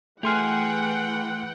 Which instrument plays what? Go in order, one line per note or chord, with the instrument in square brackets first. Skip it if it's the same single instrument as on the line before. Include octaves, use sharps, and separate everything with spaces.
[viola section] E3 F#5 G5 [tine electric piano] A3 C6 F6 [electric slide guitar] G4 G#4